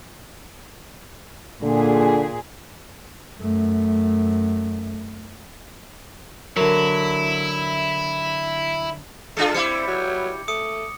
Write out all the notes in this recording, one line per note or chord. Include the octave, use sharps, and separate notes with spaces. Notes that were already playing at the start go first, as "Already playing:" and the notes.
A#2 D3 G#4
F#2 A3
D3 F#3 E4 A#4
G#3 D4 F4 A4 C#7
G3 C4 E4 D6 C#7
F#3
A3 D#6 C#7